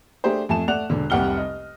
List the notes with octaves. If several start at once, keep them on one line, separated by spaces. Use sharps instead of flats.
A3 D4 G4 G#4 C5
F2 A3 G#5 A5 E7
A3 D5 F#5 F#6 F7
E1 D3
F1 C2 G4 F#5 F6 G7
D#5